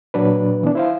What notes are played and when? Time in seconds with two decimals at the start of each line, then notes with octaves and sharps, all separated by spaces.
0.14 A#2 F#3 D4 B4
0.63 E3 B3 D4
0.75 E4 C5 F5